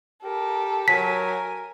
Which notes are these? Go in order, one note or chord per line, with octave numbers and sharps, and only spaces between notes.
G4 A4 A#4
F#3 A#4 G#5 B6